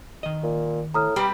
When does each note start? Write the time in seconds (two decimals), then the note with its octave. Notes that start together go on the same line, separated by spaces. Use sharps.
0.23 D#3 D#5
0.43 A#2
0.94 A2 A#5 D#6 F6
1.16 G3 C4 G4 B4